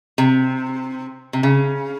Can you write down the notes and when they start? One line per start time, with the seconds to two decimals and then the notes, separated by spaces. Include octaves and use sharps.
0.18 C3
1.33 C3
1.43 C#3